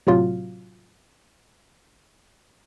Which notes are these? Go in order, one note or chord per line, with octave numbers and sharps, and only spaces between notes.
A2 C3 F#3 F4